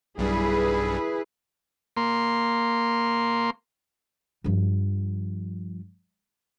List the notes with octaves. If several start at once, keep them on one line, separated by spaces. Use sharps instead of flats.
B1 G2 G3 E4 G#4 B4
A#3 C6
G2 F3